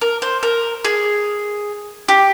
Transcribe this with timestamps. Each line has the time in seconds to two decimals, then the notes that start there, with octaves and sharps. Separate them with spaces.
0.01 A#4
0.22 C5
0.43 A#4
0.85 G#4
2.08 G4